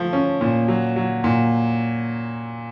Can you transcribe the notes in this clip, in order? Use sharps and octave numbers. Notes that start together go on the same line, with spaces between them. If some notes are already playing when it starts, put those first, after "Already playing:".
Already playing: F3 A3
C#4
A#2
F#3
F#3
A#2